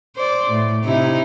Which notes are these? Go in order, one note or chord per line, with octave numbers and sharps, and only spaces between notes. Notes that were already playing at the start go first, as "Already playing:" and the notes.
C5 D5
A2
C3 D#4 E4